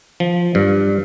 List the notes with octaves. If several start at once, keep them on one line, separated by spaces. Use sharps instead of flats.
F3
G2